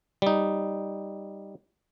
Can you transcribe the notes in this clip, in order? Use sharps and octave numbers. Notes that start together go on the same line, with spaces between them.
G3 D#4